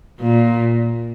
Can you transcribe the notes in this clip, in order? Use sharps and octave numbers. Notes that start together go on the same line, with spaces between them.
A#2